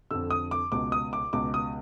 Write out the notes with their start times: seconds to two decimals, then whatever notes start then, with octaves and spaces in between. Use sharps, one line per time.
0.11 F2 D3 E6
0.31 D#6
0.51 D6
0.72 C#2 B2 D6
0.92 D#6
1.13 D6
1.33 C#2 B2 D6
1.54 D#6